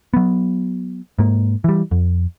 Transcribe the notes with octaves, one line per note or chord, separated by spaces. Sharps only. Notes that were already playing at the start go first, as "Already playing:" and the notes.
F#3 B3
G#2 A#3
E3 G3
F2